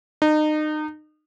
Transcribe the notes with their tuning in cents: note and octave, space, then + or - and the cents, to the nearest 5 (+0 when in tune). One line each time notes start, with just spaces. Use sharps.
D#4 -30